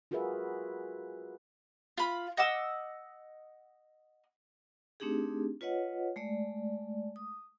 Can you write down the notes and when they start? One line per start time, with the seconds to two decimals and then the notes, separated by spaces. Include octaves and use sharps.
0.11 F4 F#4 G#4 A#4 B4 E5
1.98 F4 B5
2.37 D#5 F#5 D6 E6
5.00 A3 C4 D4 D#4 G4 G#4
5.61 F4 B4 C#5 D#5 F#5
6.16 G#3 A3 D5
7.16 D#6